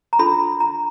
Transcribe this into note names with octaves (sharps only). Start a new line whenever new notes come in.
A#5
D4 F4 A4 B5
A#5